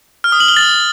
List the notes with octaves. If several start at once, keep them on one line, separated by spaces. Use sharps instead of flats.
F6
D#6
F#7
G7
A6